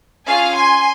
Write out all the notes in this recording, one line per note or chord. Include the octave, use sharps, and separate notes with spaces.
C#4 F4 G#4 F5 G#5
G#5 C6